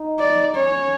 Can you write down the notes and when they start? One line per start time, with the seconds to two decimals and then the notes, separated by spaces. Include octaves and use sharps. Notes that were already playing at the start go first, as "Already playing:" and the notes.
Already playing: D#4
0.19 D5
0.55 C#4 C#5